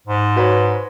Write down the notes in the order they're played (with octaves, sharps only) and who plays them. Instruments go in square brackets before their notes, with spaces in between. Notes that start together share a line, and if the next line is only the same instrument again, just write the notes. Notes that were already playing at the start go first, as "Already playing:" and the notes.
[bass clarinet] G#2
[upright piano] F#4 B4 C#5